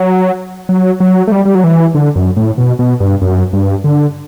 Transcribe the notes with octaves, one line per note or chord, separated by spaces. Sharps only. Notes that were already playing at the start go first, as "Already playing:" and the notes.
Already playing: F#3
F#3
F#3
A3
G3
G3
F#3
E3
D3
F#2
A2
B2
B2
G2
F#2
G2
D3